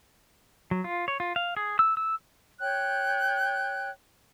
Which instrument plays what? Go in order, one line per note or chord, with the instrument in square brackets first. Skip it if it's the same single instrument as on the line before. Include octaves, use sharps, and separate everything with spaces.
[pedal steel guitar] F#3
F4
C#5
F4
F5
G#4
E6
E6
[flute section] C#5 G5 F#6 G6